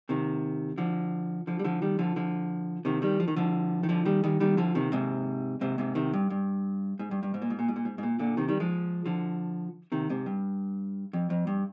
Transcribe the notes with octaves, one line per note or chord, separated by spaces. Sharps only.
C3 D#3
D3 F3
D3 F3
G3
D3 F3
D#3 G3
D3 F3
D3 F3
C3 D#3
D#3 G3
F3
D#3
D3 F3
D#3
D3 F3
D#3 G3
D#3 G3
D#3 G3
D3 F3
C3 D#3
G#2 C3
G#2 C3
G#2 C3
C3 D#3
G2
G2
G#2
G2
G2
G#2
A#2
G#2
A#2
G#2
A#2
G#2
G#2
A#2
A#2 D3
C3 D#3
D#3 G3
F3 G#3
D3 F3
C3 D#3
G#2 C3
G2
F2
F2
G2